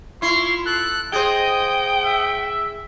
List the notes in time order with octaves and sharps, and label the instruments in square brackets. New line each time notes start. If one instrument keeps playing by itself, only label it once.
[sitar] E4 [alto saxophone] F4 [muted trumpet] C6 [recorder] C#6
[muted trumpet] A4 [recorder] F#6
[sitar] G#4 C5 [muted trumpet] D#5 [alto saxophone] G5 [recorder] D#6
[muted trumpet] E5